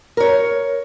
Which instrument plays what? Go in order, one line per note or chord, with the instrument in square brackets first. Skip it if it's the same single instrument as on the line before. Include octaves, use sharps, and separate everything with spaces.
[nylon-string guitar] A#4 C#5